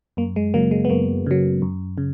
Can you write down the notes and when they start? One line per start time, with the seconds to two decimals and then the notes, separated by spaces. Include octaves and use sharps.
0.17 F#2 A#3
0.36 G#3
0.54 C#3 F#3 A#3
0.71 G#3
0.85 B3
0.90 F#2 A#3
1.26 C#3 F#3
1.62 F#2
1.98 C#3